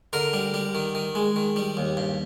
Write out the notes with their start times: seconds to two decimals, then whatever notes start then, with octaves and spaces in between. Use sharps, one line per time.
0.13 D3 A#4
0.33 G3
0.54 G3
0.75 D#3
0.95 D#3
1.15 G#3
1.36 D#3
1.56 G3
1.77 D#2
1.97 G2